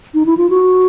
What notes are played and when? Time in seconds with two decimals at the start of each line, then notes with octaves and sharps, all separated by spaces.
0.14 D#4
0.26 E4
0.37 F4
0.50 F#4